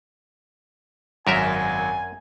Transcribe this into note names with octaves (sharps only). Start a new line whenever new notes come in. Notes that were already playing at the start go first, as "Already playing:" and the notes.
G#1 F#2 F#3 A#4 E5 G#5